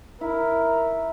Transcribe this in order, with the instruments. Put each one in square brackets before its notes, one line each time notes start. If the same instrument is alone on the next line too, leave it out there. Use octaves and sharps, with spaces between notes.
[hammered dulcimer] E4 [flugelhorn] A#4